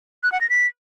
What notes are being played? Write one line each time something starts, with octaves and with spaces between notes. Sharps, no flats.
F#6
F#5
A#6
B6